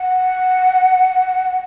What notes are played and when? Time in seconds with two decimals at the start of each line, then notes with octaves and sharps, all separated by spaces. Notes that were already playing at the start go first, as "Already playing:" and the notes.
Already playing: F#5